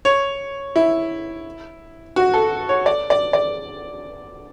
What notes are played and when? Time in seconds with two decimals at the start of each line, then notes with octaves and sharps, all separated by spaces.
0.05 C#5
0.76 E4
2.16 F#4
2.34 A4
2.69 C#5
2.86 D5
3.10 D5
3.33 D5